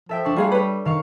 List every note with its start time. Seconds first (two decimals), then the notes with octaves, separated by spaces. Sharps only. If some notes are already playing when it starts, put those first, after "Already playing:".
0.09 F3 A4 E5 G5
0.25 D4 A4 C#6
0.36 G3 F4 G#4 F5
0.52 B4 C#5
0.85 D#3 F5 C#6